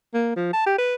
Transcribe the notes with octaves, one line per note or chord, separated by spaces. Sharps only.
A#3
F3
A5
G4
B4